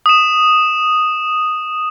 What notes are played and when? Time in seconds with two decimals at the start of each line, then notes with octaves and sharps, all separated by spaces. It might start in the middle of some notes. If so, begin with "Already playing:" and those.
0.06 D#6 E7